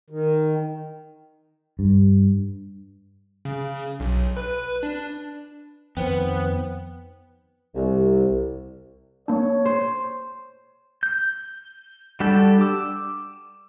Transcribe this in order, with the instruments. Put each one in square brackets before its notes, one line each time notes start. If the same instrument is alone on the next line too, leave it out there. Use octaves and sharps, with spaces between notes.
[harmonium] D#3
[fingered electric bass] G2
[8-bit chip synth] C#3
B1
B4
D4
[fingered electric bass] F2 D#3 [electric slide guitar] B3 [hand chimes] B4 C5 G5
[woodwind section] C2
[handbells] A#3 D4 [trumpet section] C#5
[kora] C5
[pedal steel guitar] G6
G3 D4 F#4 G4 A4
D6 E6